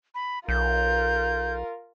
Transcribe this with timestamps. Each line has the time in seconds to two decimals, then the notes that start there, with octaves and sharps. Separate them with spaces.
0.15 B5
0.48 B1 F4 A#4 G6